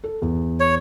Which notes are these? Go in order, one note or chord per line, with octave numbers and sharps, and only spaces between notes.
A4
E2
C#5